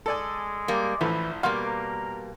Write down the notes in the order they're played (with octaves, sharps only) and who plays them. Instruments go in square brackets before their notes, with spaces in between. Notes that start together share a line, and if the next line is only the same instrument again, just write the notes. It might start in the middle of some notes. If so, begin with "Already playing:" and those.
[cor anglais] G#3 [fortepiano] A4 D5 G#5
[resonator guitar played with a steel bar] G3 A#3
[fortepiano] A1 F3 A4 [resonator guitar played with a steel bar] E3
[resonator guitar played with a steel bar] B2 G3 A#3 [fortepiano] F5 C6
[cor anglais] A#4